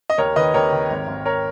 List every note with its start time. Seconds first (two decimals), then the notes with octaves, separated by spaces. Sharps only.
0.10 D#5
0.18 D#2 A#4 C#5
0.36 D#3 B4 D#5
0.54 D#2 A#4 C#5
0.72 D#3
0.90 G#1
1.08 G#1
1.26 A#4 C#5